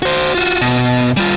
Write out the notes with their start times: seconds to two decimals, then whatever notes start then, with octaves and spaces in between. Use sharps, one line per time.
0.02 F#4 C5
0.35 F4 F#4
0.61 B2
1.17 G3 F4